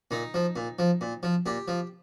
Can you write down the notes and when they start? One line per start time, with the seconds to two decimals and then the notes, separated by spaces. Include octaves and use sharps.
0.11 A#2 D#4
0.34 F3
0.56 A#2
0.79 F3
1.01 A#2
1.23 F3
1.46 A#2 G4
1.68 F3